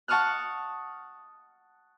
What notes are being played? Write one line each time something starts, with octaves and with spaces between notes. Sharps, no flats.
F#5 A5 C#6 D#6 F6 F#6